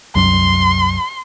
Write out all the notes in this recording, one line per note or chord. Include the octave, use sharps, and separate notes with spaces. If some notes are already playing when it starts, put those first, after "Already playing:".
C2 F#2 F#3 C6